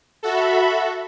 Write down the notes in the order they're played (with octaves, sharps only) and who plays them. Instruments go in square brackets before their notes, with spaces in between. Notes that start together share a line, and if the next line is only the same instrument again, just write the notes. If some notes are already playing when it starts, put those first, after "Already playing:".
[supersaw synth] F#4 A4 [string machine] E5 B5